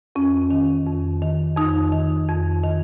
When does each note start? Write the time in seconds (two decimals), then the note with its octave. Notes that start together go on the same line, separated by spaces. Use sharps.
0.15 F2 C#4
0.51 D#3
0.86 F2
1.22 D#3
1.57 F2 D#4
1.92 D#3
2.29 F2
2.63 D#3